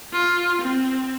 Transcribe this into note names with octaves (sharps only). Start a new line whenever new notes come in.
F4
C4